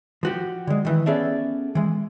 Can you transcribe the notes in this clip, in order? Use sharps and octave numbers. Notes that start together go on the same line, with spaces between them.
F3 F#4 G4
D3 G#3
D#3 E3
B3 C#4 G#4 A4 D5 E5
E3 G#3